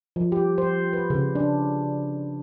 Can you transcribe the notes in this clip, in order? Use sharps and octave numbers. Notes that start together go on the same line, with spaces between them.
F3
G4
C5
B4
C#3
D4